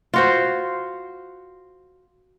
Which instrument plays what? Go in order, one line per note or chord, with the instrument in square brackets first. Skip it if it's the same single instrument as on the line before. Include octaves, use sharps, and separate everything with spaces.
[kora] F4 F#4 C5